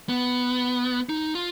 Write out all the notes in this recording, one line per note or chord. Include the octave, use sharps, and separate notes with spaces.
B3
D#4
F4